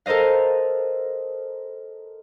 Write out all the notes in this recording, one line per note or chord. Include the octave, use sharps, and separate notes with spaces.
A4 A#4 C5 D#5 F5